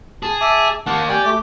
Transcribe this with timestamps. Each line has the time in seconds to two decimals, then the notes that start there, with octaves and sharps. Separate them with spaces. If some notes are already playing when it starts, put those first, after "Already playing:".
0.23 G#4 A5
0.41 E5 A5 D6
0.86 D#3 A#3 F#5 A5
1.09 G4 D5 G5 G#5
1.25 A3 D6